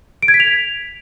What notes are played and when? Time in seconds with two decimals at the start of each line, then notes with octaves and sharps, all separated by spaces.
0.22 D7
0.28 G#6
0.34 B6
0.40 F7